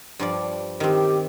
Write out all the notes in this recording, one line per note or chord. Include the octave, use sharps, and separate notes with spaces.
G2 F3 D5
D#3 C4 G4